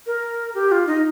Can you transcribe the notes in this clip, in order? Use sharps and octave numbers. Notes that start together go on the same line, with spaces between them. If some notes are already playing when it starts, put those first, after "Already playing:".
A#4
G4
F4
D#4